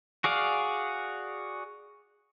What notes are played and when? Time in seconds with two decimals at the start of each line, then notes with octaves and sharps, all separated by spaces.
0.24 F#4 G#4 D5 F5